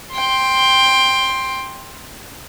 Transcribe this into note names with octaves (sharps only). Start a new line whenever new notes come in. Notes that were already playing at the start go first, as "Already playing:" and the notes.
G5 C6